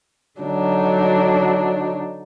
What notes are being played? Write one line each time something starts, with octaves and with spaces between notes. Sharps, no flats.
D3 F#3 D4 D#4